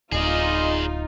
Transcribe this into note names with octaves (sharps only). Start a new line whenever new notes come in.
D1 D#4 F4 G#4 D5 D#5